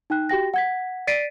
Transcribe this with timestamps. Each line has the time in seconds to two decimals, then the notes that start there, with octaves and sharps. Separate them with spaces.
0.10 D#4 G5 F#6
0.29 F#4 G4 G5 A#6
0.54 F#5 G#6 B6
1.07 D5 A6 B6 C7 D7 D#7